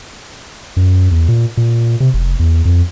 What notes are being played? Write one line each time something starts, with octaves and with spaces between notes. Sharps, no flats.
F#2
E2
A#2
A#2
C3
F1
E2
F2